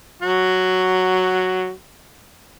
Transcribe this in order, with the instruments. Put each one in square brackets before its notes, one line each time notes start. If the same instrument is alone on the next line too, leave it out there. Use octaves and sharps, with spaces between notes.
[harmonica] F#3 F#4